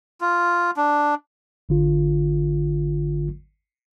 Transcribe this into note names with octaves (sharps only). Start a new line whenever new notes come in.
F4
D4
G#1 D3 F4